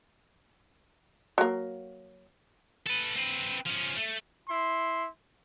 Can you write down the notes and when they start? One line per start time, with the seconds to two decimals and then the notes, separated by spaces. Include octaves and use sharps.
1.38 F#3 A#3
2.86 A4 B4
3.16 C4 B4
3.66 F3 C#4
3.96 A3
4.48 E4 C6